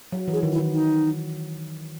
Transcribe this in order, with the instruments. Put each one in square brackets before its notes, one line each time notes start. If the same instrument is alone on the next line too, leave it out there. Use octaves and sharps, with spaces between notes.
[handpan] F#3
E3
[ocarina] G#4
[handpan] D#3
[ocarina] E4
[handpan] D#3
[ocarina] D#4